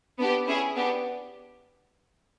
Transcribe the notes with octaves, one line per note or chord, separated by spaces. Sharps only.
B3 D4 G4
C#4 E4 G#4
B3 D4 G4